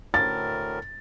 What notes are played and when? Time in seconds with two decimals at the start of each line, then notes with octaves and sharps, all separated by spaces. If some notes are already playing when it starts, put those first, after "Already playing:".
0.14 D2 A2 A#4 A6